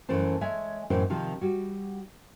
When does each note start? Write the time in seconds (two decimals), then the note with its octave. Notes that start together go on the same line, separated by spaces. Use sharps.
0.09 F#2 E3 A3 C5 A5
0.41 G#3 C#5 E5 G#5
0.90 F#2 A2 E3 D#4 C5
1.10 C3 D#3 F3 F4
1.41 G3 F#4